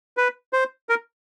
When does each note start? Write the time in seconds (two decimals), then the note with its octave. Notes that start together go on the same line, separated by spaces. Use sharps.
0.17 B4
0.53 C5
0.89 A#4